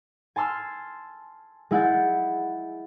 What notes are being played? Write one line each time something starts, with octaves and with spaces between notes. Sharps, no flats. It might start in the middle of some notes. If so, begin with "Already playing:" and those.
G#5 A5 C6 E6 F6
G#3 E4 F#5 G6 A6